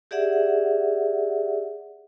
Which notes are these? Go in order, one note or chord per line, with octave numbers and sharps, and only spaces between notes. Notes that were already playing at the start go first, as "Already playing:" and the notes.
G4 G#4 D5 E5 F#5